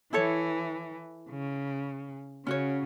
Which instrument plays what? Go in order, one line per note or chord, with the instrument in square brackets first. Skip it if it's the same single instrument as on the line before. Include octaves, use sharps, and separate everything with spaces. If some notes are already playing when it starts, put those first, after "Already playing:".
[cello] E3 [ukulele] E4 A4 C#5
[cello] C#3
[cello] C#3 [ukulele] C#4 F#4 C#5